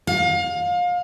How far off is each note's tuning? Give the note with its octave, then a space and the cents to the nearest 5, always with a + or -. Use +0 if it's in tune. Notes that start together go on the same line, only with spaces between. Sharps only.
F5 +30